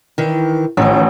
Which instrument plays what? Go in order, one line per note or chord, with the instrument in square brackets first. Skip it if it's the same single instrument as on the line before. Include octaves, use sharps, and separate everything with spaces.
[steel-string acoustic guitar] D#3 E3
[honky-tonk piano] A1 [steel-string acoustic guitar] D#3 F3